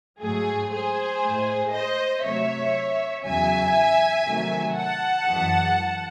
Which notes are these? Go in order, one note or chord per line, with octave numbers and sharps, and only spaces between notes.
G#2 F#3 A3 G#4
G#4 C5
A2 G#3
C5 D#5
C3 F#3 A3 C#5 E5
E2 C#3 F#3 E5 G#5
C3 D#3 F#3 A3
F#5 A5
F#2 E3 G#3